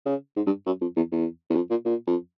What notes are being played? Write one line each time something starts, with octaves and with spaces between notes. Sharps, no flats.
C#3
G#2
G2
F#2
F2
E2
E2
E2
F2
A#2
A#2
F2